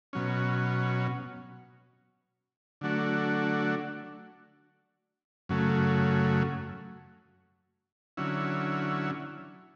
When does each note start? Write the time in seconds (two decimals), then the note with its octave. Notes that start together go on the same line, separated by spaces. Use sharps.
0.13 B2 F#3 C#4
2.81 D3 F#3 A3 D4 F#4
5.49 F#2 C#3 F#3 A3
8.17 D3 F#3 C#4 E4